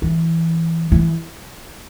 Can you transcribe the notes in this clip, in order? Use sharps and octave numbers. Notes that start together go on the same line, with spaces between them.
E3
E3